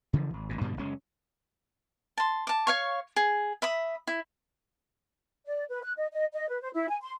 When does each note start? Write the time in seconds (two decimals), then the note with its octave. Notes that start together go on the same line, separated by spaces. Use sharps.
0.13 C#3 E3 F3
0.34 G#1
0.49 G#1 A#2
0.61 G2 B2 D3 G3
0.77 F#1 G#3 C#4
2.18 A5 C6
2.47 A5 D6
2.67 C#5 F5 C#6
3.16 G#4
3.62 E5 B5 D#6
4.07 E4
5.46 D5
5.70 B4
5.83 F#6
5.98 D#5
6.12 D#5
6.33 D#5
6.49 B4
6.61 C5
6.74 E4
6.89 G#5
7.03 C6